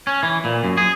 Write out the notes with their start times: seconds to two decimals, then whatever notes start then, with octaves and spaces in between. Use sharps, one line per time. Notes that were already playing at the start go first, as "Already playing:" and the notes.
0.07 C#4
0.23 E3
0.45 A#2
0.64 F#2
0.77 G#4